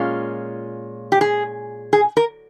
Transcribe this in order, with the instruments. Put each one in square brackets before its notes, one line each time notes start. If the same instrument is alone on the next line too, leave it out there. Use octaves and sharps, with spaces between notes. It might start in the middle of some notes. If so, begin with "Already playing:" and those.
Already playing: [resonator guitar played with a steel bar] A#2 G#3 C#4 F4
G4
G#4
G#4
A#4